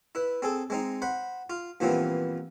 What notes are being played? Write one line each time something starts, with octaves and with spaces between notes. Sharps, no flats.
E4 B4
C4 G#4 A4
G#3 C4 D#4
C5 F#5 B5
F4
G2 A#2 E3 F3 B3 C4